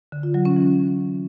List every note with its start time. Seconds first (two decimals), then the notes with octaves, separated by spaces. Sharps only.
0.12 D3
0.23 F4
0.34 F#3
0.45 C#4
0.56 E3